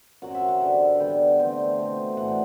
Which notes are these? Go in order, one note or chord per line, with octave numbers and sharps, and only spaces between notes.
F#2 F#3 C4 F#5
E5
F#5
G2 D3 G3 C4
D3 G3 B3 D4 G5
D3 A3 C4 G5
B2 A3 C4
A2 E3 A3 D4 F#5